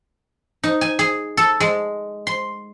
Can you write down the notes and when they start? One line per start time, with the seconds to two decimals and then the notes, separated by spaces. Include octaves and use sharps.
0.63 D#4
0.81 G#5
0.99 G#4
1.37 A4
1.60 G#3
2.27 C6